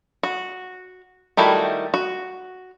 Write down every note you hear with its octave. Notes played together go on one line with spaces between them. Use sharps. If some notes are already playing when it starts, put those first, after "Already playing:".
F#4
D#3 G3 A3 E4 F#4
F#4